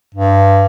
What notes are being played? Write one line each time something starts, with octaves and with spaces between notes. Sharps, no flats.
G2